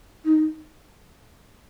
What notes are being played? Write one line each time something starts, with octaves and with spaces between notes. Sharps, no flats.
D#4